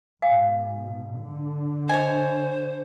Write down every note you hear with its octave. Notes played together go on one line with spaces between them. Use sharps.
G#2 B2 F5 G#5
D3
C5 C#5 D#5 G#5